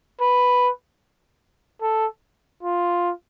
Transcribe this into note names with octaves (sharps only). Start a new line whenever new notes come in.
B4
A4
F4